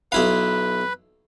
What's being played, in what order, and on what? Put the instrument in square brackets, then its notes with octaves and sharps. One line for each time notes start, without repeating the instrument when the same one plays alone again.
[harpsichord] B1 E4 F5 [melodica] B4